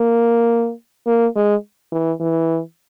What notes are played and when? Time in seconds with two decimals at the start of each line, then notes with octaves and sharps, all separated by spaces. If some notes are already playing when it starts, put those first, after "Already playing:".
Already playing: A#3
1.07 A#3
1.36 G#3
1.92 E3
2.20 E3